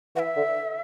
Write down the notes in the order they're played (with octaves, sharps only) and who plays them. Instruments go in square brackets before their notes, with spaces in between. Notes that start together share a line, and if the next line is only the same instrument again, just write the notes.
[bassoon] E3 [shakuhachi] F#5
[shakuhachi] E5
[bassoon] D3